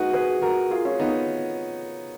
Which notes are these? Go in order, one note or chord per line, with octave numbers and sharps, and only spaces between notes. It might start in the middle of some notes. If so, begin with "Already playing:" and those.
Already playing: D#4 F#4 G#4 B4
G#4 B4
F#4 A#4
F4 G#4
C#4 F4
B3 D#4